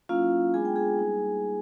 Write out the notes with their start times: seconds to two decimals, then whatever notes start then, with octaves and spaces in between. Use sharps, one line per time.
0.09 F#3 A#3 C#4 E4 F4 F5
0.54 G#3 B3 D4 F4 G#4 G#5
0.65 G5
0.76 G#4 G#5
0.98 G3 A#3 D#4